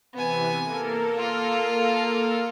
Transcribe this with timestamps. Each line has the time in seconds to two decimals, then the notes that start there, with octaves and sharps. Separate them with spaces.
0.14 C3 E3 B3 G#5
0.63 A#3 A4 A#4
1.18 F4 F5